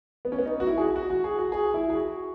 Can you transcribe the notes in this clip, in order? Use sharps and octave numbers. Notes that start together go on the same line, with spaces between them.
B3
C#4
B3
D#4
F#4
E4
G#4
F#4
F#4
F#4
G#4
F#4
G#4
E4
G#4
F#4